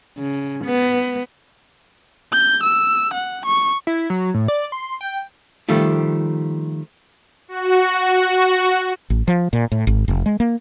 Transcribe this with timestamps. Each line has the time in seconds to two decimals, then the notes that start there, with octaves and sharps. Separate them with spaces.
0.18 C#3
0.65 B3
2.32 G6
2.63 E6
3.13 F#5
3.46 C#6
3.87 E4
4.10 F#3
4.34 A2
4.48 D5
4.72 C6
5.01 G5
5.69 D#3 F3 G3 A3 F4
7.48 F#4
8.21 F#4
9.10 A1
9.28 F3
9.53 A#2
9.72 A2
9.87 G#1
10.08 F1
10.26 G#3
10.40 A#3